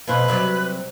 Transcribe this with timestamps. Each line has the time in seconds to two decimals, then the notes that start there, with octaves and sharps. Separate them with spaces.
0.07 F2 B2 B4 C5
0.28 C3 F#3 G3